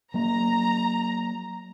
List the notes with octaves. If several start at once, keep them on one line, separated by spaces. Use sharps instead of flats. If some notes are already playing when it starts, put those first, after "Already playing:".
F#3 A#3 A#5